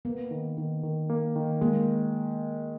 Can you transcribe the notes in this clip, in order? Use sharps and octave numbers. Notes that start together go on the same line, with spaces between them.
A#3 B3
D#3
D#3
D#3
A#3
D#3
G#3 A#3